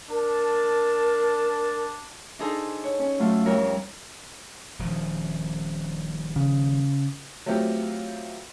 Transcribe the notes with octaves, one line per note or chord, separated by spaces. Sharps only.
D4 A#4 A5
D4 D#4 G#4 A4 C5
C#5
C#4
F#3 A3 F4 A4
F2 G3 A#4 C#5
D#1 F3
C#3
F#3 A3 B3 C4 F4 G4